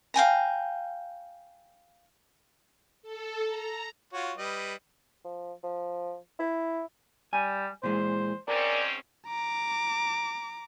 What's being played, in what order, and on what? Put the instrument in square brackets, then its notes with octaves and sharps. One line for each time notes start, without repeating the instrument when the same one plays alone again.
[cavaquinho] F5 G5 G#5 A#5
[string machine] A4
A#5
[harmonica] F4 F#4 C#5
G3 B4 D#5
[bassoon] F3
F3
E4
[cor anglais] G3 [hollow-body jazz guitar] G#5
[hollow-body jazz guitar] A#2 E3 G#3 [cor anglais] C5
[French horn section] G#2 C4 C#4 [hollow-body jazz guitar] A#4 [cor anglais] D5
[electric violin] A#5 D6